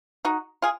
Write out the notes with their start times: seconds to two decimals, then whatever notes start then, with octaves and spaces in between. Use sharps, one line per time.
0.25 D#4 F#4
0.62 F4 G#4